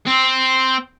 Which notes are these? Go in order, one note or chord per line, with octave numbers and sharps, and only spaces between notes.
C4